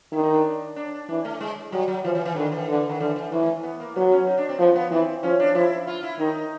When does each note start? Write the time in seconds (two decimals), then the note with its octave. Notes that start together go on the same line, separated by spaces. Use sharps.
0.13 D#3 E4
0.19 D4
0.23 D#4
0.34 D4
0.76 D4
1.09 E3 D4
1.25 A3
1.40 G#3
1.72 F#3 G3
1.88 F#3
2.04 E3 F3
2.15 E3
2.25 E3
2.36 D3 D#3
2.52 E3
2.69 D3
2.89 D#3
3.00 D3 E3
3.16 E3
3.32 E3 F3
3.43 A3
3.63 B3
3.80 A#3
3.96 F#3 B3
4.12 C#4
4.27 D#4
4.38 D4
4.49 C4
4.59 F3 B3
4.75 B3
4.91 E3 C4
5.23 F3 C#4
5.40 D4
5.55 F3 E4
5.87 F4
6.03 E4
6.19 D#3 D#4